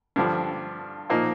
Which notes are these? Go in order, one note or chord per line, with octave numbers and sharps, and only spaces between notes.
G2 D3 F3
A#2 F3 A#3 D#4